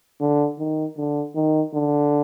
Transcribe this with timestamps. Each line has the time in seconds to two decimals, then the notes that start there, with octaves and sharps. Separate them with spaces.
0.21 D3
0.59 D#3
0.97 D3
1.35 D#3
1.74 D3